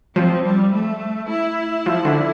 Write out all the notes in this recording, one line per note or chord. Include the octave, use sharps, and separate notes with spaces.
F3 C4
G3
A3
E4
F3
D3